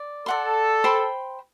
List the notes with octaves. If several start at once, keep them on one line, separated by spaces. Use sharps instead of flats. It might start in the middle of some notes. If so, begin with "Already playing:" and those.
Already playing: D5
A4 D5 F#5 C6
C5 G5 B5